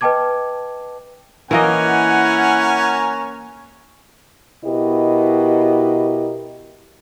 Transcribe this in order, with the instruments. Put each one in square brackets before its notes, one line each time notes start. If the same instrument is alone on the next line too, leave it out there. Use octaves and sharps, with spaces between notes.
[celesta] B4 D#5 G5 A5 D6 G#6
[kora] E3 A#3 D#5 [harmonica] C#4 A#4 G#5 [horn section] E4 F#5
[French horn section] B2 E4 G4 A#4 D#5